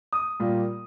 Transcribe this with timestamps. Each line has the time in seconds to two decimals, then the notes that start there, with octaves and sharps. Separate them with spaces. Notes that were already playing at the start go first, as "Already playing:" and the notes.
0.13 D#6
0.40 A#2 G3 A#3 F4